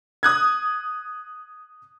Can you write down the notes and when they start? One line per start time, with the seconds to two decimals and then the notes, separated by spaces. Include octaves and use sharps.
0.23 D#6 F#6 G#6